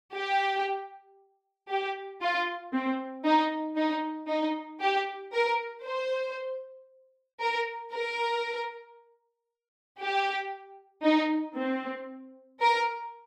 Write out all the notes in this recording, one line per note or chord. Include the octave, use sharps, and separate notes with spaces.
G4
G4
F4
C4
D#4
D#4
D#4
G4
A#4
C5
A#4
A#4
G4
D#4
C4
A#4